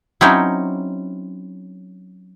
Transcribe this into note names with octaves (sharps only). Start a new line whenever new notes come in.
F#3 C4 C#4 D#4 E4 C#5